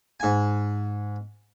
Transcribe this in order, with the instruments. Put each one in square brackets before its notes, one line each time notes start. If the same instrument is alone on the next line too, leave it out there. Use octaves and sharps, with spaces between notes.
[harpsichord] G#2 G#5